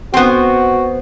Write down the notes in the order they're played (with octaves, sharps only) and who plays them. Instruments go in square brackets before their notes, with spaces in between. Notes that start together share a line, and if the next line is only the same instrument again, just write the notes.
[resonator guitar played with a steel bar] B3 C4 [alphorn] F#4